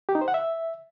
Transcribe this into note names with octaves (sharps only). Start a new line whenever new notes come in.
G4
D#4
C5
F#5
E5